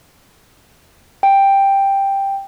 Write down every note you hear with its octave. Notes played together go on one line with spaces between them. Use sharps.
G5